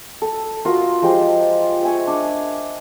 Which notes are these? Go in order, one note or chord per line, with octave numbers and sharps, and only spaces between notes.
A4
F4 F#4 A#4 D#6
F3 G#3 G4 C6
E5 G#5 C#6
D4